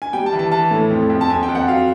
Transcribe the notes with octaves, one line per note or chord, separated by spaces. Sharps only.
G#5
G3 G5
A5
E3
A5
E3 A5
A2
F2
F2
A5
F2 G#5
G5
F2
F#5
F#3 F5